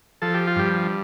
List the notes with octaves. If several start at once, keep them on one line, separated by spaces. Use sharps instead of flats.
F3 A4
G4
F4
G2 G4